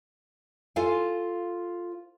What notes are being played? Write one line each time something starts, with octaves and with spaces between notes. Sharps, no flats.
F4 A4 C5 F5 G#5